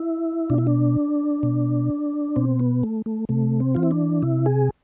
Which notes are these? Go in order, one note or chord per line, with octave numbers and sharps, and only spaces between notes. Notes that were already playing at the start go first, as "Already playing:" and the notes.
Already playing: E4
B2 D4
E4
D4
B2
B2 C4
B3
A3
A3
C3 A3
C4
E3 F4
E4
D4
C3 E4
G#4